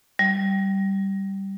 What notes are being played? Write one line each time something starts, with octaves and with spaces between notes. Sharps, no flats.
G3